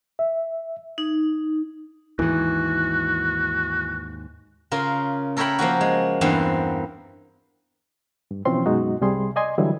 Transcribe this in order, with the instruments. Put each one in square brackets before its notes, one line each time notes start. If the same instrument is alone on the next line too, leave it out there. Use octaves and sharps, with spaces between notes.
[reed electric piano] E5
[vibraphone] D#4
[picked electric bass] D#2 G#2 [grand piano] E3 [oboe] F#4
[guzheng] C#3 F4 A#4
A4 A#4 C#5 E5 G5 B5
F3 A#3 C#4 F#4
G#3
E2 G2 A#3 C4 A#5
[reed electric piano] G2
B2 E3 F3 C4 C#4 C6
F#2 B2 G#3 D#4 F#4
C2 C3 G3 G#4 C6
D5 D#5 G#5 C6
D3 E3 F#3 G3 E4